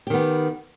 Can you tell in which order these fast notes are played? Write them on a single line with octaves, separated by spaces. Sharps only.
G4 D#3 B3